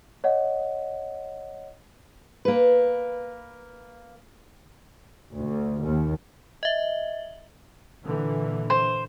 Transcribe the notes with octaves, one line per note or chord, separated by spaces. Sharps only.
C#5 D#5 F#5
A#3 B4
D2
D#2
D#5 E5
A#2 D3 E3
C5